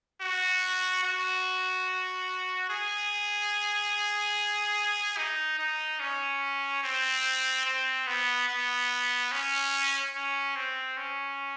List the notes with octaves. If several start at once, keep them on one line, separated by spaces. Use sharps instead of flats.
F#4
F#4
G#4
D#4
D#4
C#4
C4
C4
B3
B3
C#4
C#4
C4
C#4